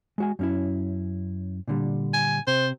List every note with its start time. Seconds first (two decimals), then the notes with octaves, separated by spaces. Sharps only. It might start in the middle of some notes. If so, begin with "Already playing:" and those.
0.18 G#3 F#4 G#5
0.39 F#2 C#4 E4
1.68 A#2 D3 G3
2.14 G#5
2.47 C3 C5